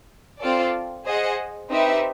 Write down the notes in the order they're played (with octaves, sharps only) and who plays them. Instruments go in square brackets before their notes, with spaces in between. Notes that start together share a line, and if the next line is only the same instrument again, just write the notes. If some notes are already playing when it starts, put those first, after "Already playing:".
[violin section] C4 F4 A4 D5
G#4 C5 D#5 F#5
C4 D#4 G4 B4 E5